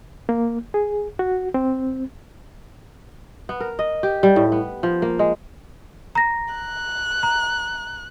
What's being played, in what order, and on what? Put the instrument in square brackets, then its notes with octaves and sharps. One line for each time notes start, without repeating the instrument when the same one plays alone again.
[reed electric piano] A#3
G#4
F#4
C4
[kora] B3
A#4
D#5
G4
G3
A2
B3
F3
A#3
G#3
[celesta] A#5 A#6
[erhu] F#6
[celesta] A#5